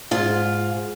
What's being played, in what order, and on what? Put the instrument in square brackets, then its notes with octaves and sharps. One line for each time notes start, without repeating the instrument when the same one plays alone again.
[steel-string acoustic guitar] G#2 F4